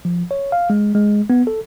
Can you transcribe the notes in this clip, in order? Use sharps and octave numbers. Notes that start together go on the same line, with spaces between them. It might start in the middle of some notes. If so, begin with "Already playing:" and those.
F3
C#5
F5
G#3
G#3
B3
A4